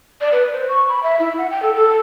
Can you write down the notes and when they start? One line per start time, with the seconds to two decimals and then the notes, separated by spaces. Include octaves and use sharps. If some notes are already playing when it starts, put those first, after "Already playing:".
0.21 D5
0.32 B4
0.53 C5
0.69 C#6
0.89 B5
1.03 E5
1.20 E4
1.38 F#5
1.51 G5
1.63 A4
1.76 A4